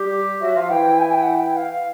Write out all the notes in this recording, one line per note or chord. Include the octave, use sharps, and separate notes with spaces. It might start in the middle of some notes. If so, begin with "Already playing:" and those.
Already playing: G3 G4
F#3 F#4 E5
F3 F4 F5
E3 E4 G5
G#5
G5
F#5
G5
F5